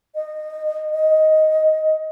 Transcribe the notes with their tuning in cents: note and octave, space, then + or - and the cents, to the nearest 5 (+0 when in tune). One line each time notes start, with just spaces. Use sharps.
D#5 -20
D#5 +10